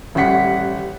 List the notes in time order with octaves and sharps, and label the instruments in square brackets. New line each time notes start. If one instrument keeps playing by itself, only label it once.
[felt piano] A1 G3 F#5 B6 C#7